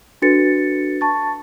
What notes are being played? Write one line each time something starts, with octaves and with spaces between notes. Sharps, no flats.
D4 F#4 A4 B4 A6 C#7
A5 C#6 A6